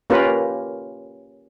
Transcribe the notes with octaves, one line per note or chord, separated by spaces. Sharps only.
A#3 C#4 F4 G4 A#4 B4